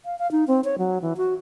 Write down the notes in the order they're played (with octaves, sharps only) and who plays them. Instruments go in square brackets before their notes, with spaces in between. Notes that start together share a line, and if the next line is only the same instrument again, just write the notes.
[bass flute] F5
F5
D#4
C4
C#5
F#3
E3
F#4